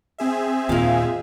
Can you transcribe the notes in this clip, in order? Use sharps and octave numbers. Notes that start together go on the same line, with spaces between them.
C4 G#4 E5
D#2 A#2 G#3 F4 F5